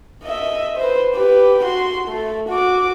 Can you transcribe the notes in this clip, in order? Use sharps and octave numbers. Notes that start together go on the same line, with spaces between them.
D#5 E5
B4 C5
G4 B4
F#4 C6
A3
F#4 D6